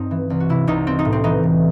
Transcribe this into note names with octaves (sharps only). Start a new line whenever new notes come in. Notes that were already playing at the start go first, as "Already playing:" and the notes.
Already playing: G2 C4 D#4
E3
C2
F#4
C3 E4
C2 D#4
G3 C4
D#4
A2
C4
E3 D#4
A2